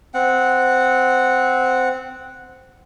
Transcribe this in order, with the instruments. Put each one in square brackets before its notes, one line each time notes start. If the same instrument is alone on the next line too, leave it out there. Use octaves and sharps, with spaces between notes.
[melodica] C4 F#5